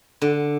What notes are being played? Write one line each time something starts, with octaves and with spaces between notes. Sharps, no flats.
D3